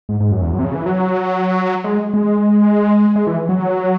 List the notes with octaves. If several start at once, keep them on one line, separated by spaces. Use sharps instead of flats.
G#2
G#2
F#2
E2
F#2
C3
C#3
E3
F#3
G#3
G#3
G#3
E3
F#3